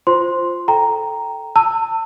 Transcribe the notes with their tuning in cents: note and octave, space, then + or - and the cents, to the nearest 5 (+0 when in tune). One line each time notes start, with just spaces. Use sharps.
F4 +0 C5 +0 C6 +0
A4 +0 G5 +0 A#5 +0
A5 +35 E6 +0